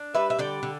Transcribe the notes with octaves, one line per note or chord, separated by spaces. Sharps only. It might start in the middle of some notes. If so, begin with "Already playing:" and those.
Already playing: D4
G3 B4 E5
E5
D3 D5 G5
D3